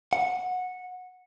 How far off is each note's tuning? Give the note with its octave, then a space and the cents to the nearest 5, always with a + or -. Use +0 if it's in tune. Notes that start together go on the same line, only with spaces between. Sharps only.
F#5 -15